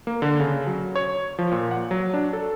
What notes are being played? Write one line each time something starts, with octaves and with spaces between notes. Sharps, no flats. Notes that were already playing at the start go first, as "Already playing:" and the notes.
A#3
D3
C#3
F#3
C#5
F3
A#2
F#5
F#3
D4
A4